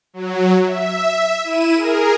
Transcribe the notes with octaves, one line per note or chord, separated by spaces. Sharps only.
F#3
E5
E4 D#7 E7
G#4 A#4